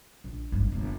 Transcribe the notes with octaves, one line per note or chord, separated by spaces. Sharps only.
A#1
G#1 G2
G1 A#2